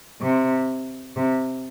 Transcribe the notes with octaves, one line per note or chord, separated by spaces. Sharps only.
C3
C3